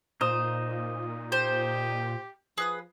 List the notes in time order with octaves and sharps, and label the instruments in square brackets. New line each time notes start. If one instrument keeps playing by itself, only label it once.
[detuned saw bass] A#2 [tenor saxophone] A#3 [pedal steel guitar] D#4 D#6 [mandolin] C5
[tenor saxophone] G4 [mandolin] C5
[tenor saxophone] F3 [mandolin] G#4 B4 D#6